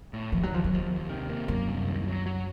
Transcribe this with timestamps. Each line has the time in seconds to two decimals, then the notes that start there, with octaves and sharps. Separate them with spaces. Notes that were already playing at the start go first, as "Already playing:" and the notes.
0.13 A2
0.32 D#2 F3
0.43 F#3
0.52 D#2 F3
0.64 F#3
0.71 D#2 F3
0.91 D#2
1.09 C3 D#3
1.30 A#3
1.48 F#2 A#3
1.68 C2
1.88 D#2
2.06 F#3
2.26 F#3